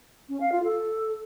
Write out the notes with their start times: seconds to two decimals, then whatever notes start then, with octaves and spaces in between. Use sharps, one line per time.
0.29 C#4
0.40 F5
0.52 F4
0.63 A4